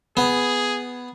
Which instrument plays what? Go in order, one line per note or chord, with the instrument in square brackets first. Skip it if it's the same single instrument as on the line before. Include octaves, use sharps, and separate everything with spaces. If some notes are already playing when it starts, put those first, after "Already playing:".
[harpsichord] B3 [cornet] G#4